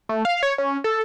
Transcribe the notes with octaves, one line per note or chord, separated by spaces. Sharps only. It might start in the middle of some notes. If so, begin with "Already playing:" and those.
A3
F5
C#5
C#4
A4